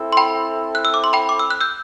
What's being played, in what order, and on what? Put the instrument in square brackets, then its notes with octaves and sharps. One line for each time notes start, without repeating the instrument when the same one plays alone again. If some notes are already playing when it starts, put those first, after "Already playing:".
Already playing: [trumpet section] C4 E4 A4
[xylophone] C6
G5 B5
F#6
E6
D6
C6
G5 B5
D6
E6
F#6
E6 G6